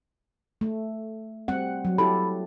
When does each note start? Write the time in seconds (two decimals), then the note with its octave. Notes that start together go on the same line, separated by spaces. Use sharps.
0.61 A3
1.48 G3 C4 F#5
1.85 F#3
1.98 E4 G4 A4 B5